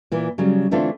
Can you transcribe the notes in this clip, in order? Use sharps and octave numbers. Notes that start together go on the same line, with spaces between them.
A#2 E3
C#3 F#3 G3
D3 E3 A3 C4 D4 F4